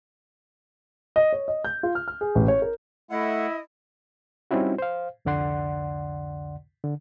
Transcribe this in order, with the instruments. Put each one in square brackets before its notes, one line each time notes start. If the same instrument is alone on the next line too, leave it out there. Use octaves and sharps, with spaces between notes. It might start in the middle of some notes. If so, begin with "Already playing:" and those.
[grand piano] D#5
C#5
D#5
G6
F4
F6
F6
G#4
A1
C#5
A#4
[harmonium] A3 F#5 [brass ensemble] E4 [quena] D#5
[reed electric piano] G3 C4 C#4 D#4 E4 F#4
C5 F5
C2 F2 D3 D5 F#5 C6
D3